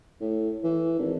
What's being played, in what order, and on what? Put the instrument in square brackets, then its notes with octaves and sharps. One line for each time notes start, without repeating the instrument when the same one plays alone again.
[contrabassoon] A2
E3
G#1